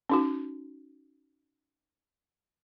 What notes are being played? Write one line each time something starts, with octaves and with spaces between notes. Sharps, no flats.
C#4 D#4 F#4